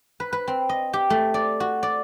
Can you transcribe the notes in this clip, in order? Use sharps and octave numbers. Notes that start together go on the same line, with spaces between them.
B4
B4
C4
D#5
G4
A3
D5
F#4
D5